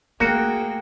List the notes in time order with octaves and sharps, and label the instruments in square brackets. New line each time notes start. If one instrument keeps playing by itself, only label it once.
[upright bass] A3 [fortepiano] A#3 [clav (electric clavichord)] F#4 [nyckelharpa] G#4 G5